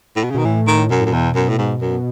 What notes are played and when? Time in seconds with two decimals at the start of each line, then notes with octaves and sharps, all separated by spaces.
0.16 A2
0.24 B2
0.30 C#3
0.35 B2 D#3
0.45 A2 E3
0.67 D#3
0.90 F#2 B2
1.00 A2
1.06 F#2
1.11 E2 B2
1.35 F#2
1.49 A2
1.58 G#2
1.81 F#2